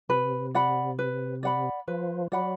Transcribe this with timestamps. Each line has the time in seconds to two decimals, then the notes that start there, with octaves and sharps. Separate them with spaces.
0.09 C3 B4
0.55 D5 F#5 B5
0.99 B4
1.43 D5 F#5 B5
1.88 F3 B4
2.32 F#3 D5 F#5 B5